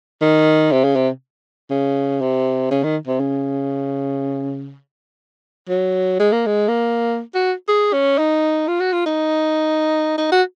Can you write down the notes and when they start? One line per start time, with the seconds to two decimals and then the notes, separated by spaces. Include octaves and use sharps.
0.21 D#3
0.71 C3
0.84 C#3
0.95 C3
1.70 C#3
2.21 C3
2.70 C#3
2.83 D#3
3.07 C3
3.19 C#3
5.69 F#3
6.19 G#3
6.32 A#3
6.46 G#3
6.68 A#3
7.34 F#4
7.68 G#4
7.93 C#4
8.18 D#4
8.68 F4
8.80 F#4
8.92 F4
9.05 D#4
10.17 D#4
10.32 F#4